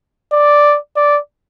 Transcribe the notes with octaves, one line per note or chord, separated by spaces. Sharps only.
D5
D5